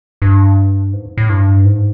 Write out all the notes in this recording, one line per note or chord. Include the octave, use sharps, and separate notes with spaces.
G2
G#2
A2
G2
G#2